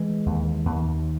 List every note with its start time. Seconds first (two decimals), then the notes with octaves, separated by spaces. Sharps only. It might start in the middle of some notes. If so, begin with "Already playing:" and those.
Already playing: E3 G#3
0.26 D#2
0.66 D#2